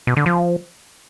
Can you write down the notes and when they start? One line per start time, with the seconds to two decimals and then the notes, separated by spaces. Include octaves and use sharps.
0.07 B2
0.17 D3
0.26 F3